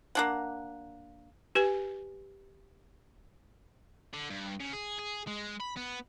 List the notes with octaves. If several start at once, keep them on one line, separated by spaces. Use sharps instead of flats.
A#3 D4 F#5
G4 B4 G#5
D3
G2
C#3
G#4
G#4
G#3
B5
B3